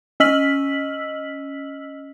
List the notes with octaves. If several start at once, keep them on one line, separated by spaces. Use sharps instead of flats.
C#4 D#5 E6 F6 B6 F#7